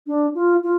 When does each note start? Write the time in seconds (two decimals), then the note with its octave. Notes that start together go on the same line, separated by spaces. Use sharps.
0.07 D4
0.35 F4
0.63 F4